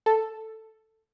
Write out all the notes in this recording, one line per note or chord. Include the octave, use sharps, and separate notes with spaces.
A4